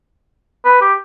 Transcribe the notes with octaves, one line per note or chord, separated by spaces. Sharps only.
B4
G4